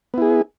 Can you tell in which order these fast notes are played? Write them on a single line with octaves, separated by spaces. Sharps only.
B3 E4 G#4